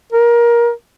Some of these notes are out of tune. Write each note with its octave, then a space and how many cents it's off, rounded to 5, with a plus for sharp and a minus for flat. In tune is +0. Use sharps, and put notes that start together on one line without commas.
A#4 +20